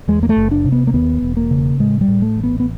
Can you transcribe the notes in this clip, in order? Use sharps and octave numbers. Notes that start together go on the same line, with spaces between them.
E2 G#3
A#3
A3
F#1
D4
C3
B3
A#3
D#2 B3
E1
A#3
C#3
A2 G#3
G3
A2
A3
A1
B3
B3